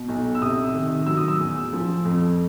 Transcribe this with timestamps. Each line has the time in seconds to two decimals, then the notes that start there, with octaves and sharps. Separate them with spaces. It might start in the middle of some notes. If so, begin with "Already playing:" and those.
Already playing: B2
0.09 B1
0.35 E6
0.41 C3 D#6
0.74 D#3
1.06 F#3 E6
1.17 D#6
1.28 E6
1.40 E2
1.73 F3
2.05 F2